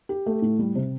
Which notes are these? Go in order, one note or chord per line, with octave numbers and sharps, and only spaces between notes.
G4
A3
A2
G3
C3